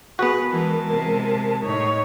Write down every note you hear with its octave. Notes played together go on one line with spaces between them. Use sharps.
B3 F#4 G#4 B4
E3 G#3 A#4 A5
C3 G#3
A2 D#4 C#5